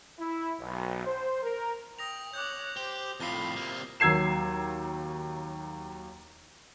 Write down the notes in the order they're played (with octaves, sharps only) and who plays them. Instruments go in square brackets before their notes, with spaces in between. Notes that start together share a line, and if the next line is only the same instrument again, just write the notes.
[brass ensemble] E4
B1
C5
A#4
[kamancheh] G5 [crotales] D#6 A#6 F7
[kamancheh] C#5 F#6 [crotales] D6 G6
[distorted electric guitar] G4 [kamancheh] C5
[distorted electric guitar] F2 A2 [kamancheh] F4 B5 [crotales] C7 G7
[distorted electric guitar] C3 A#3
[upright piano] D#2 F#3 E6 G#6 C7 E7